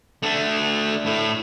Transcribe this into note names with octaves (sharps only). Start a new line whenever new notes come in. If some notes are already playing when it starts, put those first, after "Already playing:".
A3 D4
A2